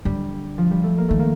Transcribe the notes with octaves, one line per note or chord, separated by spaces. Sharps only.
D3 G3
F3
G3
A3
A#3
D#3 A3
A#3